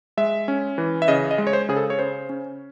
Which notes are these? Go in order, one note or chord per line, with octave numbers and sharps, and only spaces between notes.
G#3 E5
C#4
E3
E5
C#3 D#5
D#5
G#3
C#5
C5
C#3 G#4
A4
C#5
C#3 C5
C#4